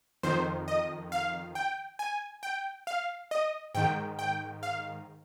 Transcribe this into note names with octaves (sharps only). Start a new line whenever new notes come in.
F2 D#3 C5
D#5
F5
G5
G#5
G5
F5
D#5
G#2 D#3 G5
G5
F5